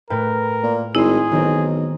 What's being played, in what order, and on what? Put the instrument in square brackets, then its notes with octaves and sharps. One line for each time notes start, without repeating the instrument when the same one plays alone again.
[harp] A2 B4 G5 [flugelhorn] A#4
[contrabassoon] A#2
[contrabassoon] G#1 [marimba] E4 [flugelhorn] G#4 [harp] C6 E6 D#7
[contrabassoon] B1 [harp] D#3 C4